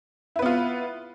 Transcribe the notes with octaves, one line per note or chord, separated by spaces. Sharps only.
B3 E4 F4 B4